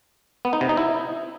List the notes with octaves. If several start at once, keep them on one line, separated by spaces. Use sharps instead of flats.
B3
D#4
C3
D#4
E4